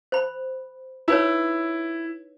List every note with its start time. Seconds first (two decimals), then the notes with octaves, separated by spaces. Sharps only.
0.12 C5 B5
1.08 D#4 E4 B4 C#5